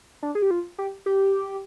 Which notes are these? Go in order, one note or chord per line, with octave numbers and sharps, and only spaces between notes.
D4
G#4
G4
F4
G4
G4